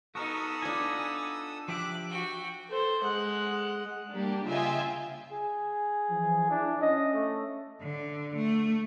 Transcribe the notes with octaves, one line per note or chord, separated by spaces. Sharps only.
B3 D#4 F#4 A4 A#4 D#6 E6
D4 F4 G#5
F3 G4 E5 D6 F#6
F#4 G5
A4 C5
G#3 F#5
G3 A#3 D4 G4
C#3 F4 D#5 E5 G5 G#5
G#4
E3 F3
D4 E4
C#4 D#5
A3
D3
A3